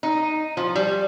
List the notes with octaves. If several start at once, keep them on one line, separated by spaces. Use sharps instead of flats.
D#4
F3
G3